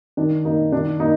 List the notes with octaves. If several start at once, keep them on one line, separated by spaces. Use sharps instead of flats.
D#3 D4
A#3 D#4
D#3 D4
A#3 D#4